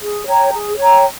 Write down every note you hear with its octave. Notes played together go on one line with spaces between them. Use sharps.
G#4
C#5 G5 A#5
G#4
C#5 G5 A#5